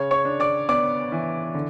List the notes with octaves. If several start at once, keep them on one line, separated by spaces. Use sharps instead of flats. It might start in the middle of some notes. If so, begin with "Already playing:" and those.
Already playing: C#3 C#5
C#5 C#6
D4
D5 D6
B3 D5 D6
E3
D3